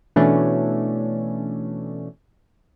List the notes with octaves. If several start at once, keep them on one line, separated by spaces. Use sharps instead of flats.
B2 E3 A3 C#4 D4